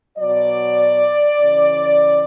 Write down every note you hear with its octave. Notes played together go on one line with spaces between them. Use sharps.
B2 F#3 D5
C#3 E3